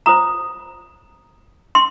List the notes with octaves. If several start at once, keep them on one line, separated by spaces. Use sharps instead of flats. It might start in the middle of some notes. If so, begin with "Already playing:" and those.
F4 C5 A#5 D#6
C6